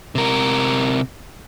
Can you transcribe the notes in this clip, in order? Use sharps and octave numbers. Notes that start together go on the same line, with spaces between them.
C3 A#4